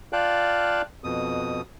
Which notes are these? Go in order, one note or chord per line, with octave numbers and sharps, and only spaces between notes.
F4 D5 F5 G5 A5 F#6
F2 B2 D#6